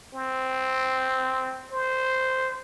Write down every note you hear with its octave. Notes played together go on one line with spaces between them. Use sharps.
C4
C5